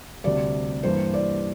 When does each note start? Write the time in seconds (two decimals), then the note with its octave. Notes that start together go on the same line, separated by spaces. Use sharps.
0.24 D2 C3 G3 D5
0.83 G2 E3 G3 A#3 C5
1.14 D5